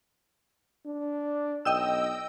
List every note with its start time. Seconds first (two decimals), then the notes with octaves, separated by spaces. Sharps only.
0.86 D4
1.65 B1 D#5 G5 E6